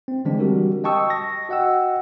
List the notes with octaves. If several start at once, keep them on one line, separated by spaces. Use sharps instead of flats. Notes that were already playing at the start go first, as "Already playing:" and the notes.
C4
D3 E3 G#3 C4 D4
G3 F#4 G4 A#4
D#5 G5 A5 C#6 D#6 E6
A#6
F#4 D#5 F#5 G5 E6